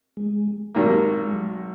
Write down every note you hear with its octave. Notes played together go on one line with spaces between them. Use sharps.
G#3
G#1 F#2 D#3 A#3
G#3
F#3